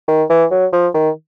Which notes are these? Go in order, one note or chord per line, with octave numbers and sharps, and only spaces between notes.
D#3
E3
F#3
F3
D#3